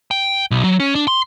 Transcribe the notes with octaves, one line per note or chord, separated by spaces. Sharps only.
G5
B1
F#3
C#4
D4
C6